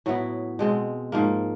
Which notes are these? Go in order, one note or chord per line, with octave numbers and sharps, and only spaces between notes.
A2 F#3 B3 E4
B2 G#3 C4
G#2 F3 A#3